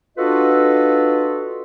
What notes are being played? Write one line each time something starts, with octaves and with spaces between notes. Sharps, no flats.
D4 F4 F#4 A4 B4 D#5